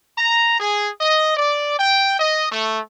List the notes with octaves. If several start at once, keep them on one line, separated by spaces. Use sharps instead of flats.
A#5
G#4
D#5
D5
G5
D#5
A3